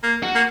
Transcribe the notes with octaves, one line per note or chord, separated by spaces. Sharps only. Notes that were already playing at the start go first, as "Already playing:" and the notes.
A#3
F#4
A#3